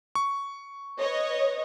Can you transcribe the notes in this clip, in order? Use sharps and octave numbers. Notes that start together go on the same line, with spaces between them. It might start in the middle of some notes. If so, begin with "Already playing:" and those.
C#6
B4 C#5 D#5